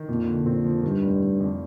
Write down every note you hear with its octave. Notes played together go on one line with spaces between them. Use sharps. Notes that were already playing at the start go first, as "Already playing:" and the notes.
Already playing: D#3
F2 A#2
D3
A#2 C4
F3
G2 D#3
F1
F1
F2